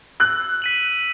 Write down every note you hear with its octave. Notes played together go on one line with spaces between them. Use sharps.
E6 F#6
B6 D#7 F#7